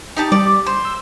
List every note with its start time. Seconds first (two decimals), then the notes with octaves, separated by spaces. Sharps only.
0.16 D#4 G4 A5
0.32 G3 D5
0.66 C5
0.85 E6